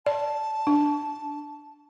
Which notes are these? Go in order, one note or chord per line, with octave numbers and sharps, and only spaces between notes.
D5 A5
D4